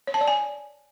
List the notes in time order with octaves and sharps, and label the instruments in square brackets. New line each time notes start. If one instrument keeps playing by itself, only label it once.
[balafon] C#5
A5
D5
G#5